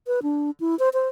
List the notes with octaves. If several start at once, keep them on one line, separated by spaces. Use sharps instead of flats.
B4
D4
E4
C5
C5